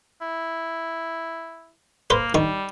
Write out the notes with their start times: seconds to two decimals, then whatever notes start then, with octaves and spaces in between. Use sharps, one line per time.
0.21 E4
2.10 A#3 B4 C5
2.35 D#3 G3 C#6